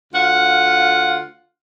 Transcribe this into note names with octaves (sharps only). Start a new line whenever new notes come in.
D2 F4 F5 F#5